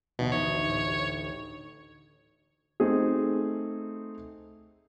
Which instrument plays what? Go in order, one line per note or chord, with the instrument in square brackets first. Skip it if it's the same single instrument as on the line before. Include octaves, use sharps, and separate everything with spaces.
[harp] A1 D2 D#4 [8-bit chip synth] B2
[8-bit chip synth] C#5
[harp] A2 G4
[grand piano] A3 C4 D#4 G#4